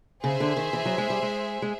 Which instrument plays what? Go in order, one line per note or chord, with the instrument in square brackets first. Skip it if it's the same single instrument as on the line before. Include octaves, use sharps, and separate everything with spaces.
[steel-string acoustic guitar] C#3 [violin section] G#4 C5 E5
[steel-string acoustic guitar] D3
D#3
E3
F#3
G#3
G3
G#3
G#3